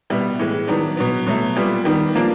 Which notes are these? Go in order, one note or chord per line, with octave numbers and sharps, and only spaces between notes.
B2 G3 B3 E4
A2 E3 G#3
D#3 F#3 B3 D4
B2 F#3 B3
B2 F#3 A3
A#2 G3 B3
D#3 G3 B3
F3 A#3 D4